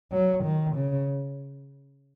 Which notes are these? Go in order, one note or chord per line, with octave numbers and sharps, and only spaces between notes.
F#3
D#3
C#3